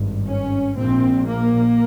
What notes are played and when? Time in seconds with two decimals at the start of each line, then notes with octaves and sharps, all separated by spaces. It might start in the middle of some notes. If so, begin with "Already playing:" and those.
Already playing: G#1 G2
0.26 C#4
0.76 A#1 A#2 C4
1.25 A#3